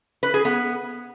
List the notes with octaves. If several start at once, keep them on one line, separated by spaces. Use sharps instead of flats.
B4
G#4
B3